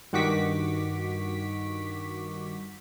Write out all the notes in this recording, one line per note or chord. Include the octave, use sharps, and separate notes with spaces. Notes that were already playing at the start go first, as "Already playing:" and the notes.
G2 D#3 F#4 C#6 D6 B6